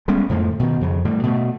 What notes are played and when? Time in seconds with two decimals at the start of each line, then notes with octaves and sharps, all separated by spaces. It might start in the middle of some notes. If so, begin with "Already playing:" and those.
0.08 G3 G#3 B3 C#4
0.29 F2 A2 D3 F3
0.60 B2 D#3
0.81 F2 C#3
1.05 A2 D3 G3
1.23 B2 A3